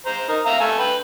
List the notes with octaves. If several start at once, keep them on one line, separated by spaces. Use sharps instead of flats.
C5 A#5
D#4 A#4
E5 F5 A#5
A3 G#5
B4 G5